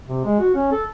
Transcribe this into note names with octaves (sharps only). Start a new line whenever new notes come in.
C3
G#3
F#4
C#4
A4